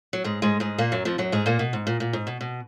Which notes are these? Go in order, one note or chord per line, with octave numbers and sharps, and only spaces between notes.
F#3
G#2 G#3
G#2 G#3
G#2 G#3
A#2 A#3
F#2 F#3
F2 F3
F#2 F#3
G#2 G#3
A#2 A#3
B2
G#2
A#2
A#2
G#2
B2
B2